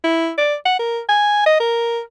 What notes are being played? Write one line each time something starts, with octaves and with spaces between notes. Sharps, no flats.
E4
D5
F#5
A#4
G#5
D#5
A#4